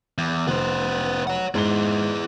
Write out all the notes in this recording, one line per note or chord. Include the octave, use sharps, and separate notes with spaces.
E2
F1 B3 C5
C#5 F#5
G#2 E4 G#4 G7